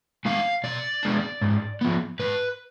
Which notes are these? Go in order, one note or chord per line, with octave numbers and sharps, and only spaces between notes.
G#3 B3 D4 F5
B2 D5
G#3 B3 D4
G#2
F3 B3
G#2 B4